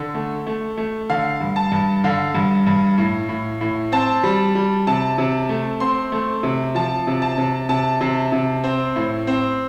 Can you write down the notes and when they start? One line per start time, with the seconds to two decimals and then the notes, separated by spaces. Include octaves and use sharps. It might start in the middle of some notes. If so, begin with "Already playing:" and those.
Already playing: D3
0.14 A3
0.47 A3
0.77 A3
1.10 D3 F5
1.41 G2
1.56 A5
1.72 G2
2.04 D3 F5
2.35 G2
2.67 G2
2.98 A2
3.29 A2
3.61 A2
3.92 C4 A5
4.23 G3
4.55 G3
4.87 C3 A5
5.18 C3
5.49 A3
5.80 C4 C6
6.12 A3
6.43 C3
6.75 F3 A5
7.07 C3
7.22 A5
7.38 C3
7.69 C3 A5
8.01 C3
8.32 C3
8.64 C4
8.96 A2
9.27 C4